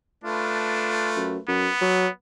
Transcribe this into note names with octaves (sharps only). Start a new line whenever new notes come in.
A3 D4 F4 B4
F#2
F#2 B3
F#3